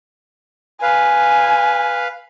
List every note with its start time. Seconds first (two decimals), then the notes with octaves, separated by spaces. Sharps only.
0.82 B4 F5 G#5